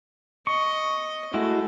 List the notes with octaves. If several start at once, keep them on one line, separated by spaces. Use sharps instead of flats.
D#5 C#6
G#3 A3 E4 F#4